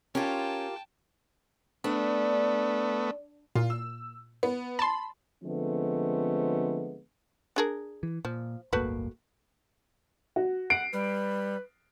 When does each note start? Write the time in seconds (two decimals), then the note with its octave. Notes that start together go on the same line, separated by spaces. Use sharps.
0.15 C#4 F4 G4 A#4 G5 A5
1.84 A3 B3 D4
3.55 A#2 F4
3.70 E6
4.43 B3
4.79 A5 B5 C6
5.43 D3 F3 G#3 A3 B3 C4
7.56 D4 G#4 A#4
8.03 E3
8.25 A#2 F3
8.73 D1 G1 A3 A#3 F#4 B4
10.36 F#4
10.70 F#5 C7 D7
10.93 G3 B4